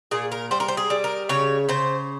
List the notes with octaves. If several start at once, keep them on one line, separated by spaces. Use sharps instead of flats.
A#2 G#4
A#4
G3 C5
A#4
C5
G#4
G3
A#4
C#3 C#5
C#3 C5